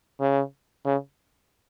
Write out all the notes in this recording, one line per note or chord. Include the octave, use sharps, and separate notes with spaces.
C#3
C#3